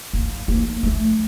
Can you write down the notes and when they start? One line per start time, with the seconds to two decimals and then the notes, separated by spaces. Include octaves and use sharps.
0.13 A#3
0.48 A#3
0.83 A3